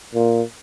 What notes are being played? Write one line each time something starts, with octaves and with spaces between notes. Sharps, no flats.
A#2